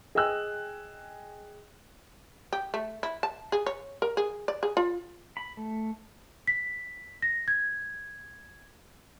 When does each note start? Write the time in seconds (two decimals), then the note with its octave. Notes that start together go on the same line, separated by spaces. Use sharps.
0.15 G#4 D#5 G5 G#5 E6 F#6
2.53 G4
2.74 A3
3.03 E4
3.23 A5
3.52 G#4
3.66 C#5
4.02 A#4
4.17 G#4
4.48 D5
4.63 G#4
4.77 F4
5.37 B5
5.57 A3
6.47 B6
7.22 A#6
7.48 G#6